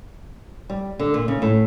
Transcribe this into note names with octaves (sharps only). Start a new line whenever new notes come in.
G3
D3
A#2
C#3
A2